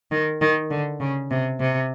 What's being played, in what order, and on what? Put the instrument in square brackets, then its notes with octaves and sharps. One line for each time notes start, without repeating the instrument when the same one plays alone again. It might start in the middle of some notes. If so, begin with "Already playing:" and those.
[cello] D#3
D#3
D3
C#3
C3
C3